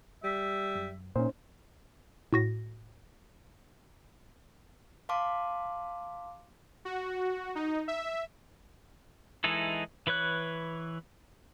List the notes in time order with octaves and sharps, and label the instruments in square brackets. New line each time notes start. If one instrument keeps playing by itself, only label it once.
[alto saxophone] G3 [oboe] E5
[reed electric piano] F#2
[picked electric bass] A#2 [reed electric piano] C#4 D#4 C5
[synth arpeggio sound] A2 F#4 A#6
[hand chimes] F5 A5 C6 D6
[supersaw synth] F#4
D#4
E5
[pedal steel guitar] E3 G#3 D#4 E4 A4
E3 B4 C#5 F#6